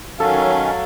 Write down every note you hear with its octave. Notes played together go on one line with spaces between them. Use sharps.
D#3 F#3 C#4 A4 F5